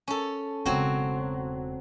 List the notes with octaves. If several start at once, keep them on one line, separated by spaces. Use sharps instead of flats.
C#4 A4
E1 C#3 F#3 C4 F#4